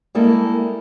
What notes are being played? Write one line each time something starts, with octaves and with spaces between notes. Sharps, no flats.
G3 G#3 A#3 E4 A4